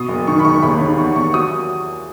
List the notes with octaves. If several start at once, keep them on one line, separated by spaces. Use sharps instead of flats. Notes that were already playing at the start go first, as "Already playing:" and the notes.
Already playing: B2 D#6
F#1
D#3 C#6
B5
E1 C#6
D#2 B5
D#3
E2 C#6
E2 C#6
F#3 D#6